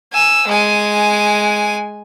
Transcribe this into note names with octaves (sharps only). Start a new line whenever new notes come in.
G#5 E6
G#3 G#5